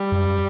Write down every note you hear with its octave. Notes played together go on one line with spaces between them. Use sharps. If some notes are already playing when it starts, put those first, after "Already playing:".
Already playing: G3
F#2